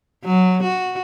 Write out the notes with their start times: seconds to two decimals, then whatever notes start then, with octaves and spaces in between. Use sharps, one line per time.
0.25 F#3
0.63 F#4